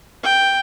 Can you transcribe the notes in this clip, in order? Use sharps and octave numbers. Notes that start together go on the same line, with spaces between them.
G5